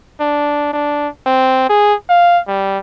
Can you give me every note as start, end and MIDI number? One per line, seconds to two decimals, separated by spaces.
0.20 0.69 62
0.73 1.08 62
1.26 1.65 60
1.69 1.94 68
2.10 2.39 77
2.48 2.79 55